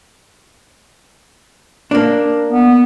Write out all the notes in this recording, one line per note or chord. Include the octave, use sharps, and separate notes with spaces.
A#3 D4
B3